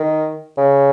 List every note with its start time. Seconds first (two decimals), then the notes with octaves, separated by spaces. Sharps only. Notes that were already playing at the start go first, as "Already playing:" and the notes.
Already playing: D#3
0.57 C#3